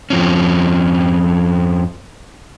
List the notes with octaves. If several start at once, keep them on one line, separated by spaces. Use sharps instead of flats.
F2 F3 C4 C#4